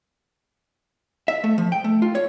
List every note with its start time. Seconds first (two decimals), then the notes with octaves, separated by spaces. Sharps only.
1.28 E5
1.44 A3
1.58 F3
1.72 G5
1.84 A3
2.02 F4
2.15 C#5